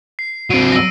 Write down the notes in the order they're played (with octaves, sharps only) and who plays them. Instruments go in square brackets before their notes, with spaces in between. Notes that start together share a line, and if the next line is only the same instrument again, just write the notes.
[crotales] C7
[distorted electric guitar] F#3 C4 [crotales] D7 D#7
[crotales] E6 A#6